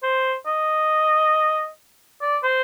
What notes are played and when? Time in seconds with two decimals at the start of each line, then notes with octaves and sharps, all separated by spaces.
0.03 C5
0.47 D#5
2.22 D5
2.44 C5